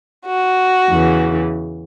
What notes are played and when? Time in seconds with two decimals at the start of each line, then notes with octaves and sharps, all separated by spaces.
0.25 F#4
0.91 E2 C#3 E3